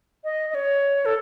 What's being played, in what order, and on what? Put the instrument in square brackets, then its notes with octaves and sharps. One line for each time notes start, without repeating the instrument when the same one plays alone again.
[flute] D#5
D#5
C#5
A4